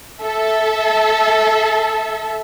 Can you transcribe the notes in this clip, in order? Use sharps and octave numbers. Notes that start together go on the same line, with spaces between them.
A4 E5